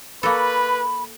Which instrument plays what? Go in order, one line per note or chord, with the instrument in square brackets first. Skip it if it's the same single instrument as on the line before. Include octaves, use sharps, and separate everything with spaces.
[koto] A#3 F#4 A4 [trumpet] B4 [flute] B5